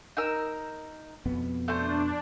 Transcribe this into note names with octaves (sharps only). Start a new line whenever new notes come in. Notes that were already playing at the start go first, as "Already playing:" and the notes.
D#4 A#4 E6
F2 B2 B3
A3 D4 C5